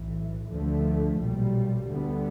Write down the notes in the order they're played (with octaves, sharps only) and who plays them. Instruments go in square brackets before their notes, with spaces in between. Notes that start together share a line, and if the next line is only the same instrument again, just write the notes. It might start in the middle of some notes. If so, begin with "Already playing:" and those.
Already playing: [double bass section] B1 A2 E3
D2 D3 F3 A3
B1 A#2 G3
D2 D3 G3 B3